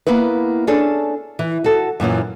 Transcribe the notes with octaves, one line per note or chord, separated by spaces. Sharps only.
A#3 B3 E4 B4
C#4 D4 G#4 A4
E3
F#4 A4
F#2 A#2 E3 C#4